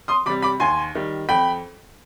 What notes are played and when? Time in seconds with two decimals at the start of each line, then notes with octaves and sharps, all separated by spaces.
0.08 C6 D#6
0.26 C3 B5 D6
0.30 G3
0.42 B5 D6
0.60 D#2 G#5 C6
0.95 D#3 G3
1.29 F2 G5 B5